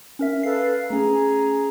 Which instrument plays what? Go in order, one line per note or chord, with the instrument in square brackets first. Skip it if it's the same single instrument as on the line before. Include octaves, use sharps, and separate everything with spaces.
[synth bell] C#4 A#4 E5
[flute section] A4 B4 F5 [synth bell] C7
[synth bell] A3 C#4 [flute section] G#4 A#5